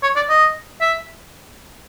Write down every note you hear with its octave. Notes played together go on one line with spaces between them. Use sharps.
C#5
D5
D#5
E5